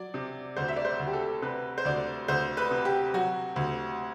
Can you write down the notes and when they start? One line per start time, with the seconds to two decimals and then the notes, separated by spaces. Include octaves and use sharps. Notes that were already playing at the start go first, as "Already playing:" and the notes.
Already playing: F#3 D5
0.14 C3
0.56 D2 C5
0.68 E5
0.76 D5
0.85 C5
0.99 D2
1.07 G4
1.13 A4
1.42 C3 B4
1.78 C5
1.85 D2 D5
2.28 D2 C5
2.57 B4
2.71 C3
2.85 G4
3.14 F#3 F#4
3.56 D2